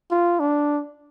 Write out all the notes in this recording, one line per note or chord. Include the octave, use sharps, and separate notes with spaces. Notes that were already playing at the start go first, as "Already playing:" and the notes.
F4
D4